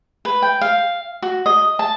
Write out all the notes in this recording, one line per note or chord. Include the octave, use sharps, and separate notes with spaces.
B4
G5
F5
F#4
D#5
A5